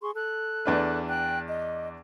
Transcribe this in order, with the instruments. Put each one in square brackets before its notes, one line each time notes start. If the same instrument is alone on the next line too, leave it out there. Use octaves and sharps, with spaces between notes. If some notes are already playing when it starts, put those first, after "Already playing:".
[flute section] G#4 C6 C#6
A4 F#6
[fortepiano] E2 D4 B4
[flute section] G5 F#6
D#5